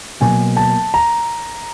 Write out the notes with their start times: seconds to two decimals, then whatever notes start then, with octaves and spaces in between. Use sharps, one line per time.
0.20 B2 F#3 A#3 G#5
0.57 A5
0.94 A#5